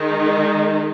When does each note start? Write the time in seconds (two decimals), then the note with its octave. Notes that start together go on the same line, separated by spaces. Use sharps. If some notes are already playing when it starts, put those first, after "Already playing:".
Already playing: D#3 G#3 D#4